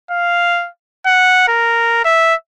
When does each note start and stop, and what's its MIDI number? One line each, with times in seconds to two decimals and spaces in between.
0.11 0.69 77
1.06 1.43 78
1.48 2.04 70
2.05 2.34 76